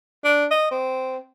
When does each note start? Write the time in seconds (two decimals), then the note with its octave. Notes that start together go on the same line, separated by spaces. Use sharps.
0.24 D4
0.51 D#5
0.71 C4